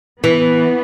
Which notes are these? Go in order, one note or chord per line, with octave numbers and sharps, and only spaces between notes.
E3 B3